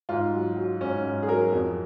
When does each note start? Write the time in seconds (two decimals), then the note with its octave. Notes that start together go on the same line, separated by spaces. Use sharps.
0.09 G#2 F4
0.33 F#3
0.57 F#3
0.81 G#2 C#4
1.04 G#2
1.23 G#4
1.28 F#3 A#4
1.53 F2